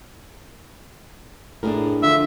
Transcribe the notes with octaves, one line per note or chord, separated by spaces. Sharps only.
A2 D4 G#4 A#4
D3 F3 F4 E5